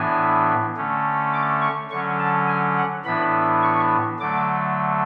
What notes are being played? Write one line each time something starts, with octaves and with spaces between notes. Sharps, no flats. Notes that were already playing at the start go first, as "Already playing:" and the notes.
Already playing: A2 E3 B3 D4 G#5
D3 A3 C#4
D6
C#6
D3 F#3 C#4 C#6
A5
G#5
F#5
A2 E3 B3 D4 B5
C#6
D3 F#3 A3 D6